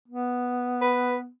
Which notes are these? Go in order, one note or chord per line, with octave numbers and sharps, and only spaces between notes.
B3
B4